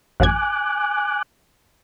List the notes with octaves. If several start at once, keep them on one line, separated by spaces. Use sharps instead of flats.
A1 F#2 G#5 D6 F#6 G#6